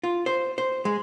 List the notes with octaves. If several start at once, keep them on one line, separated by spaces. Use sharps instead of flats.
F4
C5
C5
G#3